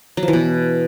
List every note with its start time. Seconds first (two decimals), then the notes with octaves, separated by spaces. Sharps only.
0.17 F#3
0.23 F3
0.28 E3
0.33 B2